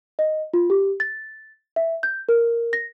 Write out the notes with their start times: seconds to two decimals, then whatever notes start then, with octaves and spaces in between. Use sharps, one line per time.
0.19 D#5
0.54 F4
0.70 G4
1.00 A6
1.76 E5
2.03 G6
2.29 A#4
2.73 A#6